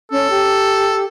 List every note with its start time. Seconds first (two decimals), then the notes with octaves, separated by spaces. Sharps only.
0.12 C#4 A4
0.30 G4